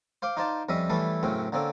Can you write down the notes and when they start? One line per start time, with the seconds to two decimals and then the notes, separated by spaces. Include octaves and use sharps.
0.22 C5 F5 C6 D6
0.37 D#4 F4 C5 D5 A5
0.69 F2 G3 C#4 D#5 E5
0.90 E3 G3 A3 C#4 E4 A4
1.23 F#2 A2 C#3 C4 C#4
1.52 D3 A#3 C4 C#4 A4